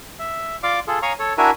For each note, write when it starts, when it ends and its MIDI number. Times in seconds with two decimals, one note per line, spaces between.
0.19 0.56 76
0.63 0.80 65
0.63 0.80 74
0.63 0.80 77
0.63 0.80 86
0.88 0.99 65
0.88 0.99 68
0.88 0.99 69
1.02 1.13 73
1.02 1.13 77
1.02 1.13 80
1.02 1.13 82
1.02 1.13 85
1.02 1.13 87
1.19 1.33 69
1.19 1.33 73
1.38 1.51 62
1.38 1.51 64
1.38 1.51 66
1.38 1.51 70
1.38 1.51 76
1.38 1.51 80